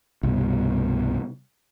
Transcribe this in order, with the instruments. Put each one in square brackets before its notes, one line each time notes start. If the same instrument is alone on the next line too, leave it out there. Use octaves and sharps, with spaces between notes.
[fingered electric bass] C2 G2 B2